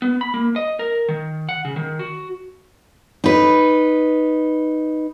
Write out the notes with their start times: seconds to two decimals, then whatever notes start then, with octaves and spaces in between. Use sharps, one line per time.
0.02 B3
0.21 B5
0.34 A#3
0.56 D#5
0.79 A#4
1.09 D#3
1.49 F#5
1.65 C#3
1.76 D#3
1.99 F#4
3.24 D#4 B4